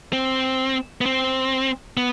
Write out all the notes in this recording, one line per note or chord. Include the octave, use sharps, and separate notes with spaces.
C4
B3
C4
B3